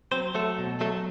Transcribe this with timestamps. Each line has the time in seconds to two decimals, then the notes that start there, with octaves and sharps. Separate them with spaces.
0.12 F#3 C4 C5
0.34 F#3 A3 A4
0.58 B2
0.81 F#3 A3 A4